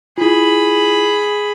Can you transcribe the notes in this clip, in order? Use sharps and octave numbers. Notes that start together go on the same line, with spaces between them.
E4 F4 G#4 B5